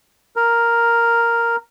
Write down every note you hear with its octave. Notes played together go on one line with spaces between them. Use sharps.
A#4